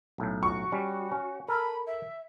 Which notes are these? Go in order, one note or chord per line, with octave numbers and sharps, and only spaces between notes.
B1 A2
F#4 C#6
G3 C#4
C#4
A4 A#4 B5
E5